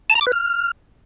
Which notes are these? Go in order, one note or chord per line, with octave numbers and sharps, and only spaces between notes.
A5
A#5
D6
B4
F6